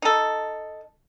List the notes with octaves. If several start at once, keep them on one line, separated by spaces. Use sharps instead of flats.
D#4 A4